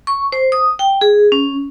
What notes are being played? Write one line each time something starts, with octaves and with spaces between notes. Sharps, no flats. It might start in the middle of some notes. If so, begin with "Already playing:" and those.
C#6
C5
D#6
G5
G#4
C#4